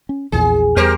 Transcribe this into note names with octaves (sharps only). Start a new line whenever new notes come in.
C#4
A#1 E2 A#2 G#4
E2 G3 G4 A#4 C5